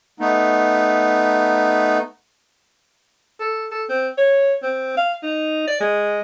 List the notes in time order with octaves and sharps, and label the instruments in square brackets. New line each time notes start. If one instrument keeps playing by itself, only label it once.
[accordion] A3 B3 D#4
[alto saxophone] A4
A4
C4
C#5
C4
F5
D#4
D5
G#3